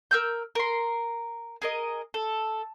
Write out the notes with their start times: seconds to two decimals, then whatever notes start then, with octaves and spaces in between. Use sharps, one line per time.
0.11 A#4 E6 G6
0.55 A#4 C6
1.62 G#4 A#4 D#5
2.14 A4